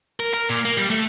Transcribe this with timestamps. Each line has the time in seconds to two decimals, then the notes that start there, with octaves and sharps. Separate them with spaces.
0.20 A#4
0.34 A#4
0.50 A#2
0.65 A#3
0.77 G3
0.90 A3